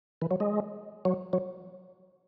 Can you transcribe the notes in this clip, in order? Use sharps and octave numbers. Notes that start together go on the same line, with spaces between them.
E3
F#3
G#3
F#3
F#3